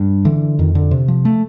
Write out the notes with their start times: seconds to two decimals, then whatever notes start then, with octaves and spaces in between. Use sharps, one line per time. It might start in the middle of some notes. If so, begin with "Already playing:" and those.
Already playing: G2
0.25 D3 E3
0.59 F2 D#3
0.75 D3
0.91 C3
1.08 F3
1.25 A3